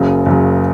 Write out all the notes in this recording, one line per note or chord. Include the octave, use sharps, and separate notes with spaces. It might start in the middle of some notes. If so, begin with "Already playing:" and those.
Already playing: F#1 F#2 C#3 F#3
F#1 F#2 C#3 F#3